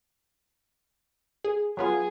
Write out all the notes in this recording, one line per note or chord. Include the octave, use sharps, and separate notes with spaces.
G#4
F#3 B3 F4 G#4